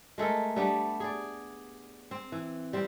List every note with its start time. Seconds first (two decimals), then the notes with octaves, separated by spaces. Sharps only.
0.18 G#3 A3 A4 A#4
0.56 G3 A3 B3 D4
1.00 G#4 D5
2.11 C4
2.32 E3
2.73 G3 C4